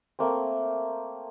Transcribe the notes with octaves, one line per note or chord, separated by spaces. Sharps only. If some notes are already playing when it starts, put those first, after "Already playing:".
A3 A#3 C4